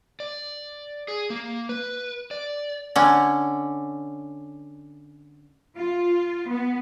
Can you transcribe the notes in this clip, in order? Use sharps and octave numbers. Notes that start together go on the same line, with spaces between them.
D5
G#4
A#3
B4
D5
D3 C#4
F4
B3